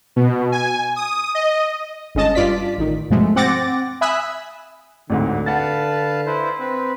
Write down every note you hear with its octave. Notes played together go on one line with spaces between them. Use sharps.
B2
G#5
D#6
D#5
G1 G#3 C#4 D#5 A5
G2 F4 D5 B6
A1 D#3
G2 B2 F3 G#3 A3
C4 F#5 G5 D6 A6 A#6
E5 G#5 B5 D#6 E6 F#6
A1 D2 G#2 D3
B4 F5 F#5 A5 A6
E4 B4 C5
C4 B4